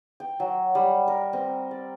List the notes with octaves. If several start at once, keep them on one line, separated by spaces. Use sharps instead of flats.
G5
F#3
G3
A#4
C4
D5